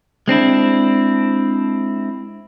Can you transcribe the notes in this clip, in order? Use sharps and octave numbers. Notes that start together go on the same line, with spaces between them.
G#3 C4 D4 E4